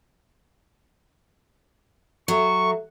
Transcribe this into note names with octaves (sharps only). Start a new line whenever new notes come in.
F#3 A4 E5 C#6